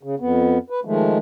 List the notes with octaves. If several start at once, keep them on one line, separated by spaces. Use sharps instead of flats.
C#3
F2 B3
B4
D#3 F3 G#3 A3